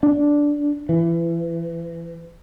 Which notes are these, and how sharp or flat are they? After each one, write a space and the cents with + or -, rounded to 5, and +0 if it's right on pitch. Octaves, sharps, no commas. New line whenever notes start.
D4 -5
E3 +30